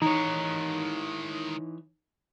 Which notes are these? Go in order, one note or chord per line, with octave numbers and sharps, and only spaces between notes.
D#3 E3 G#3 D#4 C#5 A#5